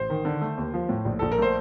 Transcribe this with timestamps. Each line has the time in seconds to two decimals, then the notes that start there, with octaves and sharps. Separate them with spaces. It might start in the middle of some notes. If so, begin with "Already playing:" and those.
Already playing: A1 C5
0.10 D#3
0.25 D3
0.41 A3
0.57 D#2
0.74 F3
0.89 A2
1.05 A#1
1.19 A#1 A4
1.32 A#4
1.38 A3 C5